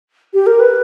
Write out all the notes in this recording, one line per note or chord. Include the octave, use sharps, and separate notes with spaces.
G4
A#4
B4